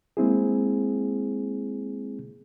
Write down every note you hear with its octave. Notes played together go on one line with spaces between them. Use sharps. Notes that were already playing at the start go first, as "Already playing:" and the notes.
G#3 A#3 C4 E4 G#4